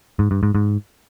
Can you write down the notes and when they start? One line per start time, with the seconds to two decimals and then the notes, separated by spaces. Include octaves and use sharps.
0.19 G#2
0.31 G2
0.43 G#2
0.55 G#2